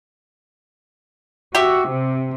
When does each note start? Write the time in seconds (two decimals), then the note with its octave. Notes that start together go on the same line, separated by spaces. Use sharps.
1.55 F#4 G4 E5
1.89 C3